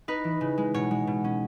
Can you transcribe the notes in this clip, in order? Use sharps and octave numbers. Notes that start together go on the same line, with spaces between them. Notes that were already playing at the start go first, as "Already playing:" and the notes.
D#4 B4
E3
C#3
G#3
B2 C#5
G#3
B2
C#4